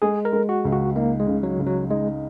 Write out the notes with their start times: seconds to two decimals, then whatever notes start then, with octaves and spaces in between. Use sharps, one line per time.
0.02 G#3 G#4
0.25 A#4
0.33 G#3
0.49 F#4
0.65 C#2
0.72 F#4
0.96 A#3 D#4
1.20 G#3
1.27 C#3
1.43 F#3
1.58 C#3
1.67 F#3
1.90 G#3 D#4